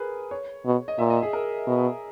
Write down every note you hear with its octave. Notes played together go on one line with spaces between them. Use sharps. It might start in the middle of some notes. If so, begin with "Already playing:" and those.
Already playing: G#4 A#4 B4
C#5
B2
D#5
A#2 E5
D#5
G#4
A#4
B2